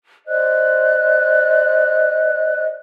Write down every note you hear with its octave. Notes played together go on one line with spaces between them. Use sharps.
C5 D5 D#5 F#6